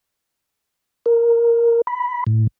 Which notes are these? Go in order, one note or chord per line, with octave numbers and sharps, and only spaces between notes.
A#4
B5
A2